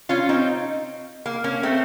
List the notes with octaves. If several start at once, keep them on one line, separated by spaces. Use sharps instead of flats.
C#4 F4
C4 D#4
A#3
A#3 C#4
A3 C4